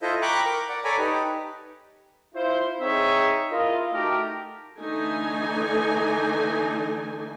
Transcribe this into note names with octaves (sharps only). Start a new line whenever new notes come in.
E4 F4 A4 C5 D#5 E5
G5 A#5 B5 C#6 D6 F#6
A#4 D6
D5 F#5
A4 C#5 D5 G#5 A#5 B5
D#4 G4 B4
E4 F4 C5
C4 D#4 G#4 C#5 E5
E4 F4 A#4 D#5
A3 D#4 F#4 G4 A#4
D3 E3 A3 D#4 G#5